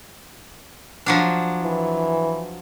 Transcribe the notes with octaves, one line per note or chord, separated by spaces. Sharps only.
F3 F#3 D4
E3